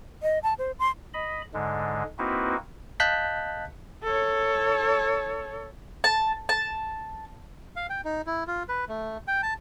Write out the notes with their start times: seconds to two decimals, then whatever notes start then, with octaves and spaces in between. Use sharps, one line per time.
0.23 D#5
0.43 A5
0.59 C5
0.79 C6
1.14 D#5 B5
1.54 G#2 D3 G#3
2.19 A#3 C4 D#4 E4 F#4 B4
3.00 D#5 F5 A5 F#6 G6 B6
4.04 A4 C#5
6.04 A5
6.49 A5
7.76 F5
7.90 G5
8.05 D#4
8.27 E4
8.47 F4
8.69 B4
8.89 A3
9.28 G5
9.43 A5